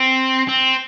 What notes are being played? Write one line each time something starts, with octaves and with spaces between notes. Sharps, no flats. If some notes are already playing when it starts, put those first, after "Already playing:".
Already playing: C4
C4